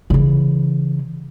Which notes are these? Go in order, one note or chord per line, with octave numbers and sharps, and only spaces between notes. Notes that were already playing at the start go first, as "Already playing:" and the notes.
C#3 E3